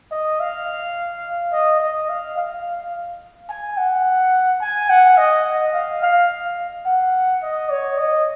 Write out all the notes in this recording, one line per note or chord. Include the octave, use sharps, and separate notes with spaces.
D#5
F5
D#5
D#5
F5
F5
G#5
F#5
G#5
F#5
D#5
F5
F5
F#5
D#5
C#5
D#5